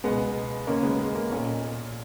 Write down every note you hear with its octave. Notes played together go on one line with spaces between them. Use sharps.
C#2 B2 G#3 B3
D#2 C#3 A#3 C#4
G#3 B3
G#3
A#3
B1 A#2 A#3 C#4